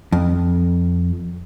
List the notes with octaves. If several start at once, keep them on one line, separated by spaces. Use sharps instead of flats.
F2